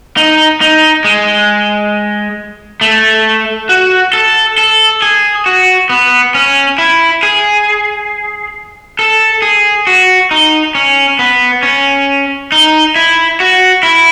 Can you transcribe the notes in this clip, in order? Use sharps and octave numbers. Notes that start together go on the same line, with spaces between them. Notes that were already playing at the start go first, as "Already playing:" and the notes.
D#4
D#4
G#3
A3
F#4
A4
A4
G#4
F#4
B3
C#4
E4
G#4
A4
G#4
F#4
D#4
C#4
B3
C#4
D#4
E4
F#4
E4